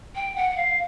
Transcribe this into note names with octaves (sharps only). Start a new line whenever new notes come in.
G5
F#5
F#5
F5